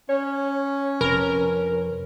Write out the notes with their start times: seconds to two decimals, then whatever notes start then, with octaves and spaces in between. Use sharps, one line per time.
0.09 C#4 C#5
1.01 F2 C3 A#4 B4